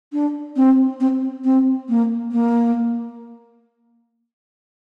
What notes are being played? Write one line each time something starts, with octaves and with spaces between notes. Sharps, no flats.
D4
C4
C4
C4
A#3
A#3